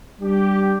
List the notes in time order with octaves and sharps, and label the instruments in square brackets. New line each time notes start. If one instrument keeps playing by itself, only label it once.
[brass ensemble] G3 D4 G4